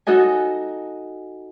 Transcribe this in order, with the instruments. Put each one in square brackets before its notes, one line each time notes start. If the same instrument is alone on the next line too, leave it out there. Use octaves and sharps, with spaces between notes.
[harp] D#4 F#4 A4 D#5 G#5